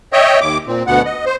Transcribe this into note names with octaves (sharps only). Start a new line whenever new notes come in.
C#5 D#5 E5 G5
D#2 D6
A#2 C4
D2 B2 B3 F#5
D#5
C5